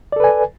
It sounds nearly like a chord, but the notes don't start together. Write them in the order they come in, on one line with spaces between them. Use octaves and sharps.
D5 A4 B4 G#5